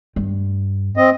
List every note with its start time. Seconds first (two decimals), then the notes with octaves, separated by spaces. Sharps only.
0.16 G2
0.97 C4 D#5